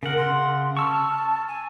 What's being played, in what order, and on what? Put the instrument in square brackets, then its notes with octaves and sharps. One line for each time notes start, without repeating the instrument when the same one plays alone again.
[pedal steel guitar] C#3 F#5 [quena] A#4
[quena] C6
[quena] A5 [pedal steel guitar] C#6 E6 F6
[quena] G#5